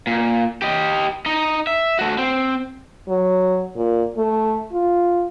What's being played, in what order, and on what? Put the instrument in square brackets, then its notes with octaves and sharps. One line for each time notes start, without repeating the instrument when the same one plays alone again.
[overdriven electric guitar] A#2
G4 D#5
D#4 D#5
E5
A3 F#4
C4
[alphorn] F#3
A#2
A3
F4